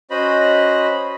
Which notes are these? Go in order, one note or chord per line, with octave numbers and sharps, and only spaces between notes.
C#4 F#4 C5 D#5 B5